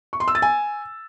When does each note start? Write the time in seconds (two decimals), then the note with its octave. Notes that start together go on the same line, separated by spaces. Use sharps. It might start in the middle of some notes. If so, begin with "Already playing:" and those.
0.13 C#6
0.20 C6
0.28 E6
0.35 A6
0.42 G#5